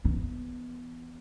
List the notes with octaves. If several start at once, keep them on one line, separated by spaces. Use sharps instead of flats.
E3 B3